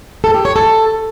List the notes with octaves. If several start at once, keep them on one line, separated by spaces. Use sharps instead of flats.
A4
G4
C#5
A4